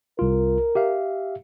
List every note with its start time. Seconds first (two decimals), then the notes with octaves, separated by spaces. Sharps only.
0.19 C2 F4 A#4
0.75 G4 E5 F5